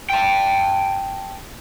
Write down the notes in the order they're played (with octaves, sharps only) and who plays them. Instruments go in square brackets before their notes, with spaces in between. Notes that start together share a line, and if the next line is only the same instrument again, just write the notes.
[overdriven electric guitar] G5 A5